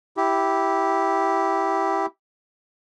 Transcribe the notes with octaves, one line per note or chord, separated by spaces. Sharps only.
E4 G4